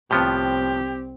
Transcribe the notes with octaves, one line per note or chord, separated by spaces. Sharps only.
C2 A2 F3 B3 C4 G4